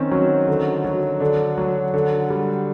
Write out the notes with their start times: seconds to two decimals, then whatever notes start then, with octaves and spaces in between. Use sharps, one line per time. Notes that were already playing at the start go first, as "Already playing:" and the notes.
Already playing: D#3 C4 C#4
0.11 F#3
0.48 D3
0.84 F#3
1.20 D3 D4
1.58 F#3
1.94 D3
2.30 G3